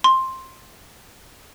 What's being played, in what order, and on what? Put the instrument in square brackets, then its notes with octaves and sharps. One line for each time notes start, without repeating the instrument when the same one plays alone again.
[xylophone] C6